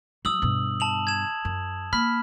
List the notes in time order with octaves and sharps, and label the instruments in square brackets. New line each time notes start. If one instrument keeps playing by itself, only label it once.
[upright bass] F#3 [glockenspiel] D#6 E6 F#7
[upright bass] G2 B2
[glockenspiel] A5 F7 F#7
G#6 E7
[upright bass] F#2
[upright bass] A#3 [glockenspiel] B5 F6 B6